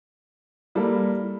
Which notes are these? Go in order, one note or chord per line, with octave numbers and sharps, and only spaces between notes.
G3 A#3 E4 A4